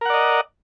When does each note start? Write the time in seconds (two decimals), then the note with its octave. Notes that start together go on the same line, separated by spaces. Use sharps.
0.01 A#4
0.05 F#5
0.10 D5
0.14 D#5